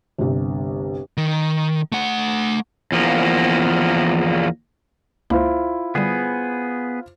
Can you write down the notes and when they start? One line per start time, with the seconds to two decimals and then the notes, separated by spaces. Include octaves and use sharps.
0.18 G1 C2
1.17 D#3
1.92 A3 F#5
2.92 E2 F3 A#3
5.30 C#2 A#3 E4 F4 C5
5.95 D3 G3 B3 G#4